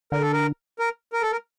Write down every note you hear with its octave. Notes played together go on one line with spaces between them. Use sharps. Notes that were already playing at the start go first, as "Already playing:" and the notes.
D3 A#4
A4
A#4
A#4
A#4
A4
A#4